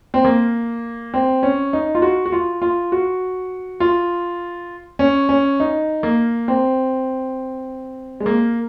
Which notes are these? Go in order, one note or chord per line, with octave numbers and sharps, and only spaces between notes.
C4
A#3
C4
C#4
D#4
F4
F#4
F#4
F4
F4
F#4
F4
C#4
C#4
D#4
A#3
C4
G#3
A#3